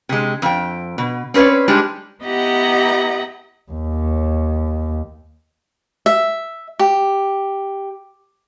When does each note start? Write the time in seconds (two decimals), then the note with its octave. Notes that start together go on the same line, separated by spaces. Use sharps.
0.09 C3 G#3
0.42 F2 G5
0.98 B2
1.34 C4 C#4 B4 C#5 D5
1.68 G3 G#3 D4 D#4 G4 A5
2.24 B3 E4 G4 D#5 F#5 A#5
3.72 D#2
6.06 E5
6.79 G4